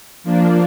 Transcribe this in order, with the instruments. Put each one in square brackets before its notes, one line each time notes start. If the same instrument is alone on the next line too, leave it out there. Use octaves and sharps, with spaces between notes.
[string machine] F3 A#3 D4